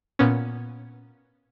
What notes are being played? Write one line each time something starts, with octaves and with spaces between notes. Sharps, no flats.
A#2 B3 C#4